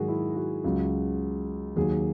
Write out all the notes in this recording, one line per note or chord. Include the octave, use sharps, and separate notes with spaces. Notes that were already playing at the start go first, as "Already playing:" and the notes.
Already playing: G#2 D#3 F#3 F#4 G#4
E4
F#4
C#2 C#3 F#3
D#2 D#3 F#3 G#4